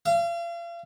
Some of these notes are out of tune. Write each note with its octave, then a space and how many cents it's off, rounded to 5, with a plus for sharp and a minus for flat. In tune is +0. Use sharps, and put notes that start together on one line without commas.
F5 -40